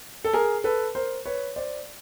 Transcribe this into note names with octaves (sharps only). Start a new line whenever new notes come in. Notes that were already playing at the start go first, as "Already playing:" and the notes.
A4
G#4 A#4
A4 B4
A#4 C5
B4 C#5
C5 D5